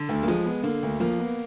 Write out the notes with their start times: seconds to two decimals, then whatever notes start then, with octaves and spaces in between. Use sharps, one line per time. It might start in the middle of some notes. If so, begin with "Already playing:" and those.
Already playing: D3
0.09 D2
0.23 A#3
0.28 F3 G#3
0.46 B3
0.63 D3 A#3
0.83 D2
1.00 F3 A#3
1.19 B3